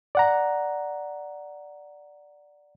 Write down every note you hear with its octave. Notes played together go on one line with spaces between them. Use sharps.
D5 F#5 A#5